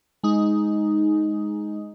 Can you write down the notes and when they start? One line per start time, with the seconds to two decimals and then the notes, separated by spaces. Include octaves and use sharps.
0.23 G#3 D#4